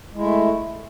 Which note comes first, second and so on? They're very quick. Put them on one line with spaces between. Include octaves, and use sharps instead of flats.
G#3 E4 A3